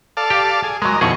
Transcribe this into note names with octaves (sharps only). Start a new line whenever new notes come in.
A4 D5 F5
G4
G#4
F#3 G#3 A#4 D#5
F2 B2 D#3 E3 G#4 C#6